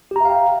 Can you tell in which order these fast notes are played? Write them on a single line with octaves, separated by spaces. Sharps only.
G4 A#5 E5 F5 G5